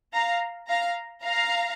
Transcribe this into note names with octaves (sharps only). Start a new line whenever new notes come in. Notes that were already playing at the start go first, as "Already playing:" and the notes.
F5 A#5
F5 A#5
F5 A#5